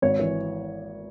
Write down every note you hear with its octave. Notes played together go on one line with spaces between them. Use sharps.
G#1 C#5
E3